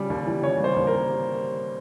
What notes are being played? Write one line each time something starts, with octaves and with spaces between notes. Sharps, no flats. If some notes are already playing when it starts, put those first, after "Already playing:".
Already playing: C#3 G3 D5
D#2
E3
C#3 C#5
G3 C5
D#2
A#4